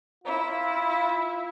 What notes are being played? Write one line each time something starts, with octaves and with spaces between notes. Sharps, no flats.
E4 F4